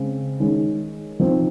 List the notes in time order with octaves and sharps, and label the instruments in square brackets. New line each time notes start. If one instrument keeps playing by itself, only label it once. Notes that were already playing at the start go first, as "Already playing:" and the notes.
Already playing: [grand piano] C#3 G#3 C4
D#3 G#3 C#4
F3 C4 D#4